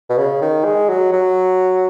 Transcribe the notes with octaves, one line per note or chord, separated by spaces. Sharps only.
B2
C#3
D#3
G#3
F#3
F#3